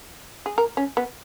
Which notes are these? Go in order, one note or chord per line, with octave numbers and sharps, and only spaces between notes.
G#4
A#4
C#4
B3